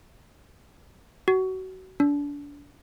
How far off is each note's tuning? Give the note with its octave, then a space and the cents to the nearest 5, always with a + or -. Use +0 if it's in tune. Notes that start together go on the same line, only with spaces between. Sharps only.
F#4 +25
D4 -30